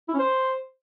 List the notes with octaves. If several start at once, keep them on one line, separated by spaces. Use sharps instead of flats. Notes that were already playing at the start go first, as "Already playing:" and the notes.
E4
C#4
C5